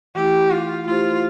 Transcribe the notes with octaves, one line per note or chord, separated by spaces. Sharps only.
E3 A3 E4 G4
F4
A3 E4 F4 G4 C5